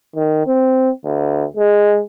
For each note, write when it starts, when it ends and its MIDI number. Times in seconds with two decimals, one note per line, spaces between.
0.16 0.45 51
0.46 0.90 60
1.05 1.44 38
1.57 2.01 56